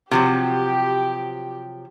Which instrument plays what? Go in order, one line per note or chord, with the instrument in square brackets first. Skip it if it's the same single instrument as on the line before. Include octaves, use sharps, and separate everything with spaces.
[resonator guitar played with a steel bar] C3 F3 F#3 [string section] G4